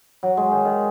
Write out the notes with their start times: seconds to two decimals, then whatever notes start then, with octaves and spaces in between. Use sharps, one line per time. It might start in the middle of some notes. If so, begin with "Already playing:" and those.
0.23 F#3
0.37 G#3
0.51 D#3
0.65 D#3